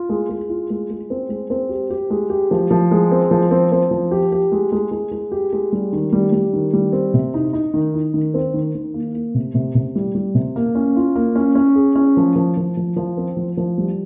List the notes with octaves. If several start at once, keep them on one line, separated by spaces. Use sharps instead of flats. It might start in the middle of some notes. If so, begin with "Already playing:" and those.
Already playing: F4
G#3
G#3
F4
G#3
G#3
C4
G#3
C4
G4
G4
G#3
G4
F3
F3
G#3
C4
F3
C4
C4
F3
G4
G4
G#3
G#3
G#3
G#3
G4
G#3
G3
D#3
G3
G3
D#3
G3
C4
C3
D#4
D#4
D#3
D#4
D#3
C4
D#3
D#3
A#3
A#3
C3
C3
C3
G3
G3
C3
A#3
C#4
F4
A#3
C#4
C#4
G#4
C#4
F3
F3
F3
F3
F3
C4
F3
F3
G3